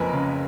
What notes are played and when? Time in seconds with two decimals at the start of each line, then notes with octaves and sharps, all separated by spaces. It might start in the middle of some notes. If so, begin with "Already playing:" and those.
Already playing: F#1 F2 G#3 A#4 B4
0.13 C#3